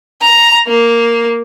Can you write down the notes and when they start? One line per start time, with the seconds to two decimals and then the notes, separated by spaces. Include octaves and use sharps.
0.22 A#5
0.67 A#3